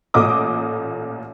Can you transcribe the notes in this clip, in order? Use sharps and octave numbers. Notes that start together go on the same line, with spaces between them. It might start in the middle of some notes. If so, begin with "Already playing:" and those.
A1 A#2 A3 D#5 D6 D#6